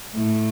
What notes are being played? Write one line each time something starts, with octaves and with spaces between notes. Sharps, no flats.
A2